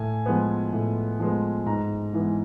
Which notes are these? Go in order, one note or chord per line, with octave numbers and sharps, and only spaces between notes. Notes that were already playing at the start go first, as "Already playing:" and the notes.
Already playing: A2 G#5
F3 G#3 B3
A2
F3 G#3 B3
G#2 A#5
E3 G#3 B3